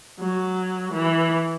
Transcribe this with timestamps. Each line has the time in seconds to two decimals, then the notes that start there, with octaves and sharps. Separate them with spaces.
0.20 F#3
0.93 E3